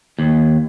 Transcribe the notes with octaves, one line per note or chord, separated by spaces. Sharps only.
D#2